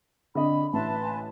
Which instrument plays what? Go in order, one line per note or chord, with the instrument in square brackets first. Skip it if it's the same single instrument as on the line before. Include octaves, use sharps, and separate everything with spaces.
[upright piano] D3 C4 D#5 [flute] B5
[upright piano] A1 [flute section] B4 A5 C6 [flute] E5
[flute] G#5